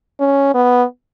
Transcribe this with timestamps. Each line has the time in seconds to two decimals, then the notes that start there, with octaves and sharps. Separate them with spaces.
0.20 C#4
0.54 B3